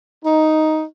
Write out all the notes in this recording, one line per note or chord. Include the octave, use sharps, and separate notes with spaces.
D#4